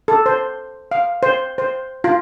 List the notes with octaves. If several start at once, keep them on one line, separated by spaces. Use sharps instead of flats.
A4
C5
F5
C5
C5
F4